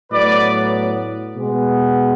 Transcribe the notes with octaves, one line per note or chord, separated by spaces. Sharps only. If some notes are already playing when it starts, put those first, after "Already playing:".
A2 F#3 B3 B4 D5
B2 G#3 B3